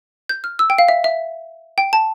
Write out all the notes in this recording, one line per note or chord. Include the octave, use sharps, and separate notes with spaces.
G6
F6
E6
G5
F5
E5
E5
G5
A5